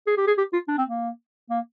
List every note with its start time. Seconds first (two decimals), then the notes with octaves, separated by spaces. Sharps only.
0.07 G#4
0.17 G4
0.27 G#4
0.38 G4
0.53 F4
0.68 D4
0.78 C4
0.88 A#3
1.50 A#3